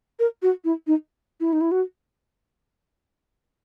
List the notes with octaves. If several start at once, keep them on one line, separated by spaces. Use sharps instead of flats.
A#4
F#4
E4
D#4
E4
D#4
E4
F#4